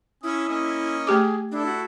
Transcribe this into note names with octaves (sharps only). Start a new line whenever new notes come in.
C#4 E4 G#5 D#6
A#3 C#4 D#5
A3 G4 G#4 D6
D4 E4 A4
F#4